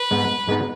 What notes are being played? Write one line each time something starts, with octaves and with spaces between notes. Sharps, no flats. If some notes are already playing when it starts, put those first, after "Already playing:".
Already playing: B4
G#2 G#3 B3 D#4
G#2 G#3 B3 D#4